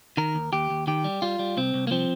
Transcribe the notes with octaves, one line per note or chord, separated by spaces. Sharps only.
D#3 A#4
D#2
D#2 G4
D#2
D#3 G4
G3
G3 F4
G3
C2 C4
C2
A#3
F3 C4